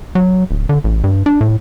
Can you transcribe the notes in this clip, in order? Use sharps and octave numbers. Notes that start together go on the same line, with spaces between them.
F#3
D1
D3
A1
G2
D4
A2